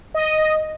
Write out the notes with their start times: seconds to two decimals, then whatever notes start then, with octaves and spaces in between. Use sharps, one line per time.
0.14 D#5